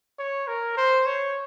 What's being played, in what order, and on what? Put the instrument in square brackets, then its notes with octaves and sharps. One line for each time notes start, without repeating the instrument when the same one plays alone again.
[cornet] C#5
A#4
C5
C#5